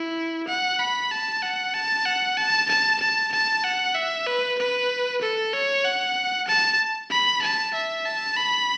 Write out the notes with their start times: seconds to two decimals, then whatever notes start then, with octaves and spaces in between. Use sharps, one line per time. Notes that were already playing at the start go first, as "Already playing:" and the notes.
Already playing: E4
0.48 F#5
0.79 B5
1.11 A5
1.42 F#5
1.74 A5
2.05 F#5
2.37 A5
2.69 A5
3.00 A5
3.32 A5
3.64 F#5
3.95 E5
4.27 B4
4.58 B4
5.21 A4
5.53 C#5
5.84 F#5
6.47 A5
7.10 B5
7.42 A5
7.74 E5
8.05 A5
8.37 B5